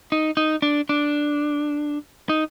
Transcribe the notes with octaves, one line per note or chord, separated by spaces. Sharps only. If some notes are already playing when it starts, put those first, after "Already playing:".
D#4
D#4
D4
D4
D#4